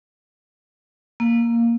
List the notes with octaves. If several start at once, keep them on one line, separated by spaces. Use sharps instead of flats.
A#3